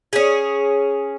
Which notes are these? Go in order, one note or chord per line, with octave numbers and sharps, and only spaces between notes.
C#4 G#4